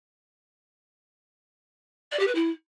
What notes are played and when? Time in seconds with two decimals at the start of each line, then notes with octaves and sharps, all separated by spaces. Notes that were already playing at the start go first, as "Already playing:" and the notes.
2.11 D5
2.19 G4
2.27 B4
2.35 E4